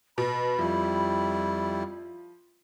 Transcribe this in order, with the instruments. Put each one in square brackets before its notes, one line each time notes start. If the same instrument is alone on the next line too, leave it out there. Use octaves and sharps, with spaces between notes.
[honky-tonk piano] B2 [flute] B5
[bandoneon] F2 G3 E4 [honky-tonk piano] F3